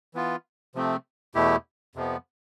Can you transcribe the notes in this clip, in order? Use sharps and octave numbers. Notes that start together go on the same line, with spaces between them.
E3 B3 F4
C3 F3 A3 C4
E2 B2 A3 E4 G4
F2 C3 F3 B3